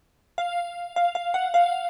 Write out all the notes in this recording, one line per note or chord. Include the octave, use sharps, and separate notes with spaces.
F5
F5
F5
F#5
F5